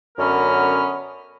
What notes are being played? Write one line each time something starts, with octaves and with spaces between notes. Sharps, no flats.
F#2 D3 B3 C#4 A#4 F6